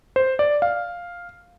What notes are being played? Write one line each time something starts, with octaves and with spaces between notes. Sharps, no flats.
C5
D5
F5